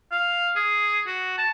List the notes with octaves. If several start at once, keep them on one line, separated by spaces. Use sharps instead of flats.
F5
G#4
F#4
A5